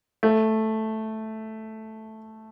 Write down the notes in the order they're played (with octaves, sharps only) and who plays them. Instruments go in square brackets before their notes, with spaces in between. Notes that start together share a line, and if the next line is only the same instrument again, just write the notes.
[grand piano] A3